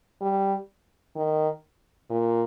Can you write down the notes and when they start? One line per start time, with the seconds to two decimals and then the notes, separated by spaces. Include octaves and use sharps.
0.21 G3
1.16 D#3
2.10 A#2